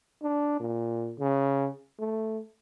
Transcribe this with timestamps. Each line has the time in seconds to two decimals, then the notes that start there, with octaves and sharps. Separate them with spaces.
0.23 D4
0.60 A#2
1.19 C#3
2.00 A3